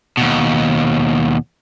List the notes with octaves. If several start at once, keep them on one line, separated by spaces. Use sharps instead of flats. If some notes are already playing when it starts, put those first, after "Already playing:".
D#2 B2